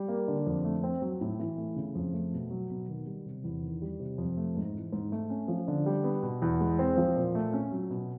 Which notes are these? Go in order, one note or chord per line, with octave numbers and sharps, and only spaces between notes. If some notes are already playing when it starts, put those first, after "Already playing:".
Already playing: G3
A#3
D3
F2
A3
C4
F#3
A2
E3
A3
C#3
F2
A3
B2
F#3
B2
D#3
G3
C3
E2
D#3
G3
C3
F2
A3
G#2
E3
G#2
A3
C#4
F3
D3
G3
B3
B2
E2
G#3
C4
F3
A#2
A3
C#4
F#3
B2